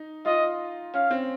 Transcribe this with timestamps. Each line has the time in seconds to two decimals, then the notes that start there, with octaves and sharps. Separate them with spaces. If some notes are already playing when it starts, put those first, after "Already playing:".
Already playing: D#4
0.25 F4 D#5
0.94 C#4 F5
1.11 C4